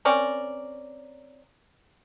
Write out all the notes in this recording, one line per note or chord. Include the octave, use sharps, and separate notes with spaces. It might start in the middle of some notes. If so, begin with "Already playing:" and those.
C4 C#4 A#4 D5